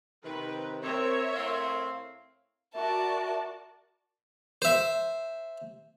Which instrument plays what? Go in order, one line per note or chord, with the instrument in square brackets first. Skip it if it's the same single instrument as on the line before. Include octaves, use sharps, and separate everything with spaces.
[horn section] C3 D#3 [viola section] B4
[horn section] C4 [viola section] A#4 C#5 E5
[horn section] A2 C4 F5
[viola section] F#4 D5 [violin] A#4 A5 [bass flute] E5
[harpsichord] C5 E5